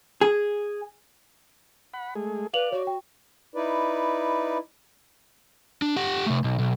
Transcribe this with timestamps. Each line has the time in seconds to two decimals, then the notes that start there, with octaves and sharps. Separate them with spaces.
0.21 G#4
1.94 F#5 B5
2.15 G#3 A3 G#4
2.54 B4 D5 F5 F7 F#7
2.72 F#4 C#5
2.87 G5
3.54 D#4 E4 B4 D5
5.82 D4
5.97 G4 F#5
6.26 C3 A3
6.44 B1
6.59 B1